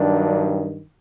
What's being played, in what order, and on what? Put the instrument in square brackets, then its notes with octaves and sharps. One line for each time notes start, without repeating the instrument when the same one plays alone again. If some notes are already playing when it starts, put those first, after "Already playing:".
Already playing: [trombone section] G2 D#3 F#3 D4